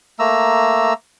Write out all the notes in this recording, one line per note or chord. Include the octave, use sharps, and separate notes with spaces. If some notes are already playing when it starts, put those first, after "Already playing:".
A3 A#3 A#5 E6